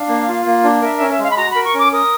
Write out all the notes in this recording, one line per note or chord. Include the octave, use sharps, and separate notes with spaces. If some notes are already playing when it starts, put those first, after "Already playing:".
Already playing: D4 F5
A#3
F4
A#3
D4
A#4 E5
C#4 E5
E5
G#3 F5
B5
F#4 A#5
A#4 B5
C#6
C#4 D6
A#4 D#6